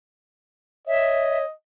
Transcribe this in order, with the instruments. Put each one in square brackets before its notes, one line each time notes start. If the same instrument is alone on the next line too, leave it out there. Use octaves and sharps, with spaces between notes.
[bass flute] C#5 [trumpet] D#5 [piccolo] E5